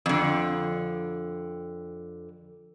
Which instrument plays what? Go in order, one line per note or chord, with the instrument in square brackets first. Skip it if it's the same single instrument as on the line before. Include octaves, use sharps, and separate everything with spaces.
[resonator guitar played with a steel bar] F2 D3